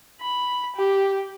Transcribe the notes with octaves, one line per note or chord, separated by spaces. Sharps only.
B5
G4